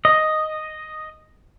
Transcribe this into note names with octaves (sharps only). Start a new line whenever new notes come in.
D#5